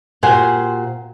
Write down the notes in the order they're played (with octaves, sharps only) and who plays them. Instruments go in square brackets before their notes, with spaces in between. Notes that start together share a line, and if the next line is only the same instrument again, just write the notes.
[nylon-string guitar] A#2 F#4 G4 C5 F#5 G#5